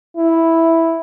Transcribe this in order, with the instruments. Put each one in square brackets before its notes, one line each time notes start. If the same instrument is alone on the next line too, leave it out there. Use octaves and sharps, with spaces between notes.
[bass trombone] E4